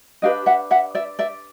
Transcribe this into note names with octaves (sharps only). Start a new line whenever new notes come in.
D4 G4 B4 D#5 F5
E5 F#5
E5 F#5
D5 E5
D5 E5